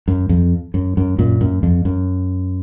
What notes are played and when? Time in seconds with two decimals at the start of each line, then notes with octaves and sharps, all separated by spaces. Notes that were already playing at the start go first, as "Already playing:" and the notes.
0.08 F#2
0.29 F2
0.74 F#2
0.97 F#2
1.18 F#2 A#2
1.41 F#2
1.63 F2
1.85 F#2